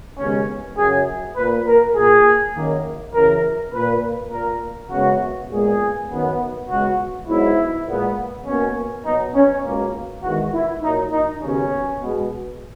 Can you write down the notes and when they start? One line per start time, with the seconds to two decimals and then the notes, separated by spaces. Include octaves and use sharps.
0.18 D#2 C#3 G#3 B3 C#4
0.77 F#2 C#3 F#3 G#4
1.36 A#2 A#3 B4
1.67 A#4
1.95 A#2 A#3 G#4
2.55 F#2 D#3 A#3
3.14 F#2 C#3 E3 A#4
3.73 A#2 A#3 B4
4.32 A#2 A#3 A#4
4.91 F#2 C#3 G#3 B3 F#4
5.50 A#2 G#3 B3 G#4
6.09 F#2 D#3 F#3 B3
6.68 C#2 B2 G#3 F#4
7.27 G#2 F#3 B3 E4
7.87 A#2 G#3 B3
8.45 B2 A#3 C#4
9.05 B2 F#3 B3 D#4
9.34 C#4
9.64 C#2 B2 A#3
10.23 E2 D#3 G#3 B3 F#4
10.53 E4
10.82 A#2 F#3 A#3 D#4
11.12 D#4
11.41 D#2 C#3 F#3 B3 C#4
12.00 B2 G#3 B3